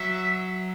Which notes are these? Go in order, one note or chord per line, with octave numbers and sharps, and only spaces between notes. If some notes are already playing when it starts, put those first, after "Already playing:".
Already playing: F#3 E5